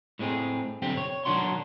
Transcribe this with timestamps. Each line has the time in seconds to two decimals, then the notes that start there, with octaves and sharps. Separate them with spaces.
0.19 A2 G#3 C4 G#4
0.82 B1 G2 D3 C4 G4
0.97 C#5
1.25 B1 D#3 F#3 D4 F#4 C6